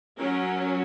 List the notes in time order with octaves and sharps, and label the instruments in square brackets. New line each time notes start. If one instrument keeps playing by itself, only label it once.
[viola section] F#3 C#4 A#4